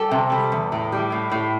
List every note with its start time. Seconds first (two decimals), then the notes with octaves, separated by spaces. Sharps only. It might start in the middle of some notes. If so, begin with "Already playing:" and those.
Already playing: G3 A4
0.11 C3
0.32 G3
0.52 E2
0.72 A2
0.92 G3
1.12 A2
1.32 A2